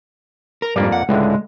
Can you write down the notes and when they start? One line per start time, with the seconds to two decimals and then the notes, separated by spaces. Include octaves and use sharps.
0.62 A#4
0.76 F2 G#2 G3 A#3 D5
0.92 F#5
1.09 C#2 A2 D3 G#3